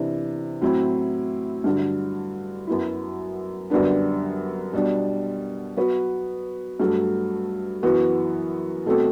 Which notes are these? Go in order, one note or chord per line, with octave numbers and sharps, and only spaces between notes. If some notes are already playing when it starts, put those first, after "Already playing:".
Already playing: C3 E3 D4
A2 F#3 C4 E4
G2 D3 F#3
F#2 F#3 B3 E4
F#2 D3 G3 B3 D4
B2 G3 D4
F#3 B3 F#4 B4
G2 F#3 A3
F#2 E3 B3 F#4
B2 A3 C4 F#4 A4